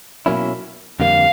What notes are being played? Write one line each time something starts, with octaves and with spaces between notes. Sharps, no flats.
B2 F#3 A#3 C#4 E4
F2 D3 G3 A#3 F5